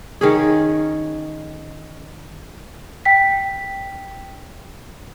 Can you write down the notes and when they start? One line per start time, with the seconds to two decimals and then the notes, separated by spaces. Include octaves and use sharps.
0.21 D#3 C#4 G#4
3.05 G5 B6